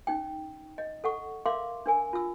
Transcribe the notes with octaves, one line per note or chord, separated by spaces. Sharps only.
C#4 D#4 G5
D#5
A4 F#5 C#6
A#4 E5 F5 C6 D6
D4 A#4 G#5
F4 E6